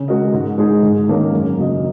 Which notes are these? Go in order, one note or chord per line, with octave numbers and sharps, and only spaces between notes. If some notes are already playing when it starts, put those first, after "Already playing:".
Already playing: C#3
G#3 F#4 A#4 D#5
G#2
G#3 D#4 G#4
G#2
D#3 A#3 C#4 A#4
F#2
C#3 A#3 F#4 D#5